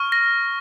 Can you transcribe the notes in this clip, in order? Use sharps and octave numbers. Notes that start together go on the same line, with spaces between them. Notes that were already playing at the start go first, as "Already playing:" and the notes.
Already playing: C#6 F6
A#6